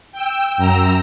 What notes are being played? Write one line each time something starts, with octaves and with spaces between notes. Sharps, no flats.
G5 E6
F#2 A#5 E6